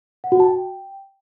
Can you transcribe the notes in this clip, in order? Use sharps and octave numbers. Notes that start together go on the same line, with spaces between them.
F#5
F#4
A5
G5